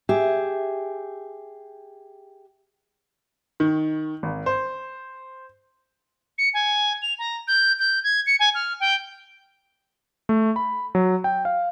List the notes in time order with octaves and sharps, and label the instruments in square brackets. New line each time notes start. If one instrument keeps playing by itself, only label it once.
[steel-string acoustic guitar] G4 G#4 E5
[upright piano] D#3
G#1
C5
[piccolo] C#7
G#5
F7
A#5
G6
G6
G#6
C#7
G#5
F6
G5
[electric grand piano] A3
B5
F#3
G5
F5